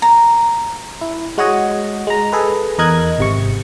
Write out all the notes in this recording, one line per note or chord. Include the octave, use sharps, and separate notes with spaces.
A#5
E4
G#3 F#4 C#5 D#5 F#5
G#3 A#5
G#4 A4 B4
E2 A#4 D#5 F#6 G#6
G#1 C3 C#6